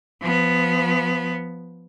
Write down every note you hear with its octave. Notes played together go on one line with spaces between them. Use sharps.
F3 B3